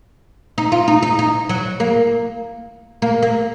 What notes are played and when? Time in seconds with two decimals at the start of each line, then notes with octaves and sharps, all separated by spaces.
0.58 D#4
0.72 F4
0.88 D#4
1.02 D#4
1.19 D#4
1.49 F#3
1.80 A#3
3.02 A#3
3.23 A#3